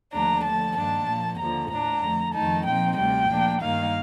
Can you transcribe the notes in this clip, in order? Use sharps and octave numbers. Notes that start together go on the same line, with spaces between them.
D#2 D3 F3 A3 D4 A#5
D3 F3 A3 A5
G2 D#3 A#3 D4 A5
A#2 F3 A#3
D#2 D3 F3 A#3 A#5
A2 A3 D4 A#5
F2 D3 A3
F2 D#3 A3 D#4 A5
A#2 F3 C4 D#4 G5
D2 C3 G3 G5
A#2 F3 A#3 D4
G2 D#3 A#3 D#4 F5